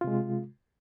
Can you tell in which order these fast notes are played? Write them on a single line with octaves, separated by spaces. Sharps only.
F4 C3 G#3